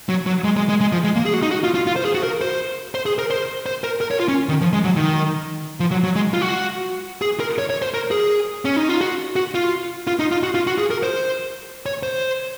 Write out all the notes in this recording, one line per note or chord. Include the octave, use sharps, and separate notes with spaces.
F#3
F#3
G#3
G#3
G#3
G#3
F3
G#3
A#3
G#4
F#4
D#4
F#4
F4
F4
F4
C5
G#4
F#4
A#4
C5
C5
G#4
A#4
C5
C5
A#4
A#4
C#5
F4
C#4
D#3
F3
G#3
F#3
D#3
F3
F#3
F#3
G#3
F4
F#4
G#4
A#4
C#5
C#5
C5
A#4
G#4
C#4
D#4
F4
F#4
F#4
F4
F4
D#4
F4
F#4
F4
F#4
G#4
A#4
C5
C#5
C5